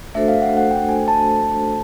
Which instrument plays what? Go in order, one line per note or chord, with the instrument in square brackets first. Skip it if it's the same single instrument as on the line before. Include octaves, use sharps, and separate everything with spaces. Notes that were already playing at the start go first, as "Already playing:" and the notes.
[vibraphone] A3 D4 F#4 A4 C5 [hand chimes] E5
[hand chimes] F5
F#5
F#5
G5
G#5
A5